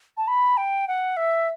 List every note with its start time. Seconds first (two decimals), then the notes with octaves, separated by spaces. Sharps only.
0.17 A5
0.28 B5
0.57 G5
0.88 F#5
1.17 E5